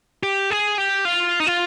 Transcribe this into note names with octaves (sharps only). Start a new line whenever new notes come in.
G4
G#4
G4
F4
D#4
F4